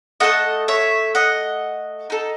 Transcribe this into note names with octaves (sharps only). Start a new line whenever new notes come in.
A3 D#4 A4 D#5 F#5
C#5 E5
D#5 F#5
D#4 A4